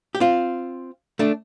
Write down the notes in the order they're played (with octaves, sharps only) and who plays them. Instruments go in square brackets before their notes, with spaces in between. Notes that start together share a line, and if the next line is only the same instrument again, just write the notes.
[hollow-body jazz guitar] G4
C4 F4
A3 D4